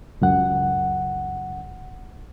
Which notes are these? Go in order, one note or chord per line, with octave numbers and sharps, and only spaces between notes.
C#2 F#2 F#5